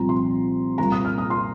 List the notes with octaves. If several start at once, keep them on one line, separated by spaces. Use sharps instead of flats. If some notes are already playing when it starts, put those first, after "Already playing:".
Already playing: C2 A#2 F3 C4 A#5
C6
C2 A#2 A#3 A#5
D#6
F6
D#6
C6